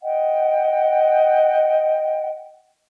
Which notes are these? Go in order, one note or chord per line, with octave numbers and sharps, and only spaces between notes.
D#5 F#5 G5